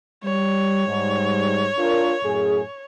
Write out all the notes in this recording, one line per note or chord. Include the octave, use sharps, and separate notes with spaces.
G3 C#5
G#2 G3
D4 F4 A#4
F#2 A2 G#4